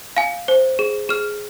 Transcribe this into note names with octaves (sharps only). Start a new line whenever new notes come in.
F5 G#5
C5
G#4
G#4 F6